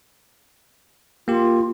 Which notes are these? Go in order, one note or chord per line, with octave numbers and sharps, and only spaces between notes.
A#3 F4 G4